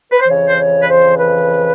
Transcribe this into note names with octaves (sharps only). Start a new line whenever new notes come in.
B4
C5
F2 C#3 E3 C#5
C5
C#5
B4
C5
B4